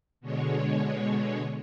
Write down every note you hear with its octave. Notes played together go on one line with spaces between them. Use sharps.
B2 D3 G#3 C#5